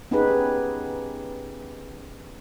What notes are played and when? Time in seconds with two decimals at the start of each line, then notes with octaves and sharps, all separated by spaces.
0.11 B3 C#4 D#4 G4 G#4 B4